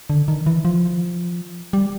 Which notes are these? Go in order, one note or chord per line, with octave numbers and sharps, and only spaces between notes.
D3
D#3
E3
F3
G3